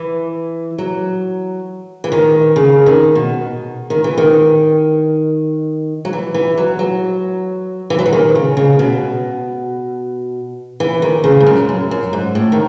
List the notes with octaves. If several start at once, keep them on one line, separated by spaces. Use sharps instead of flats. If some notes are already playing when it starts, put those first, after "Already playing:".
Already playing: E3
F#3
E3
D#3
C#3
D#3
B2
D#3
E3
D#3
F#3
E3
E3
F#3
F#3
E3
F#3
E3
D#3
C#3
C#3
B2
E3
D#3
C#3
G#2
F#2
F#2
F#2
G#2
A2
D#3